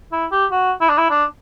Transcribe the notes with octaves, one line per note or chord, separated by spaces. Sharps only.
E4
G4
F#4
E4
D4
E4
D4